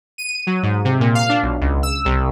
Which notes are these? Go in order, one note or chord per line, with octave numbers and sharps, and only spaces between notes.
D#7
F#3
G#2
C3
A#2
F5
D4
B1
C#2
E6
C2